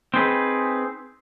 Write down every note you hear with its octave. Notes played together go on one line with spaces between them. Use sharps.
C4 D#4 G#4 B4